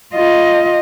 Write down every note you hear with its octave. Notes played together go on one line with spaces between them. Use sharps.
F4 D#5